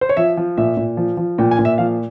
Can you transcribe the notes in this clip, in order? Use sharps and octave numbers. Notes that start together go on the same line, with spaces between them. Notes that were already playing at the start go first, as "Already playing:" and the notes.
C5
C#5
F3 E5
F3
A#2 E5
A#2
F3
F3
A#2 G5
G#5
A#2
E5
F3 F5